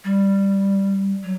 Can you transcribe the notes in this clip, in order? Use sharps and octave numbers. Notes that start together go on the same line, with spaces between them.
G3
F#3